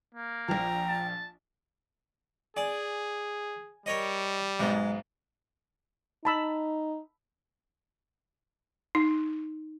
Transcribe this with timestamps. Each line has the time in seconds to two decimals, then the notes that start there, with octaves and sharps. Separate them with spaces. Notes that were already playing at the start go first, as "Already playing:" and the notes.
0.15 A#3
0.48 A#1 F3 G5 A#5
0.89 A5
2.57 G#4 D5 G#5
3.86 G3 A#4 C#5 D#5
4.59 B1 G#2 G#3
6.25 D#4 A5 B5 E6
8.95 D#4